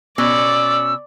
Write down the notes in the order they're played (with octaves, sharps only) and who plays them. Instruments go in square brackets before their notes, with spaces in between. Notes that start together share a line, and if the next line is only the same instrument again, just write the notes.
[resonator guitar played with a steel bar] B2 C#4 [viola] D5 [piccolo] E6